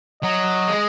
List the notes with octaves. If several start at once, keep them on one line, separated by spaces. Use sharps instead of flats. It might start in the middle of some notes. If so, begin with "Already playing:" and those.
F#3 D#5
G#3